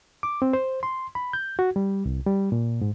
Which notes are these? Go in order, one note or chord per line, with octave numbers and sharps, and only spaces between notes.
D6
C4
C5
C6
B5
G6
F#4
G3
C2
G3
A#2
G#2